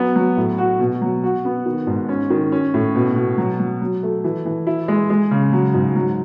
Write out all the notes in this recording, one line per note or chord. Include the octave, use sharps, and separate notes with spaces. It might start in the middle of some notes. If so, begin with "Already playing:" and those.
Already playing: F#3 B3
F#3
A2
F#4
B2
F#3
F#4
B3
D#3
G#2
C#4
D#3
C#4
A2
B2
B2
F#3
F#3
F#3
A3
E3
E3
E4
G#3
G#3
C#3
F#3
G#2
F#3